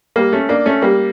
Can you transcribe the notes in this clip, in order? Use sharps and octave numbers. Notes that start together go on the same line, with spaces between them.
G3 A#3
A3 C#4
A#3 D4
A3 C#4
G3 A#3